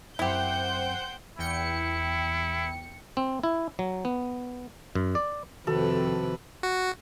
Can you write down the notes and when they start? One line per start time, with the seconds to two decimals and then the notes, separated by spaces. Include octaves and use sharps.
0.19 F#2 C4 E4 G4 C5 F#5 G5 G6
1.38 E2 E4 G5 C#7
3.17 C4
3.43 E4
3.79 F#3
4.05 B3
4.95 F#2
5.15 D5
5.67 F2 C3 D#3 F#4 A4 B4
6.63 F#4